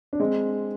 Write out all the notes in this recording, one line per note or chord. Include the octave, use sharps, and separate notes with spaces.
D4
G#3 C4